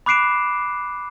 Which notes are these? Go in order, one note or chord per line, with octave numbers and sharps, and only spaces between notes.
B5 D6 F#6 C7 D7 E7